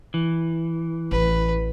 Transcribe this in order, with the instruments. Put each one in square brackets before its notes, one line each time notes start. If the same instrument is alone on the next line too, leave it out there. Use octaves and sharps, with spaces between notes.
[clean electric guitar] E3
[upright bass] A1 [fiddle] B4